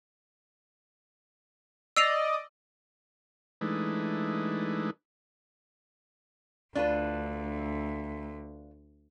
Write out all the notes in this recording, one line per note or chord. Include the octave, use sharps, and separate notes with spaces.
D5 D#5 E6 C7 F7
E3 G#3 A3 D4 D#4 B4
D2 D4 F4 B4